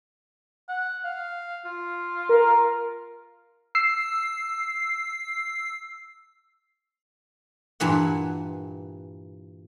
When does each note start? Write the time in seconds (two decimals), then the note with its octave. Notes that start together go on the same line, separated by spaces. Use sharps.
0.69 F#5
1.04 F5
1.65 F4
2.29 A#4
3.75 E6 C7
7.80 G2 A#2 E3 F#5